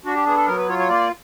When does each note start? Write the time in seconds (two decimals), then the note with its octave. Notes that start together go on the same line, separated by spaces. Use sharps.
0.05 D4 F#4
0.15 G4
0.26 B3 G#4
0.36 A4
0.47 F#3 A#4
0.58 B4
0.68 F4 C#5
0.79 C#5
0.89 A#3 D5